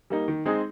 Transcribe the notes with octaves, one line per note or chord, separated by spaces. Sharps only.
G3 A#3 D#4
D#3
G#3 C4 D#4 G#4